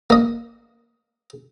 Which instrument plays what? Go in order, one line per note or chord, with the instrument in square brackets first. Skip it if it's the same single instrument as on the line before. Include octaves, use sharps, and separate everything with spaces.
[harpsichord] A#3 D#5